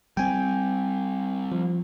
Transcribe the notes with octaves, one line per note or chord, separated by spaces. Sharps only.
G3 C4 G5 G#5
F3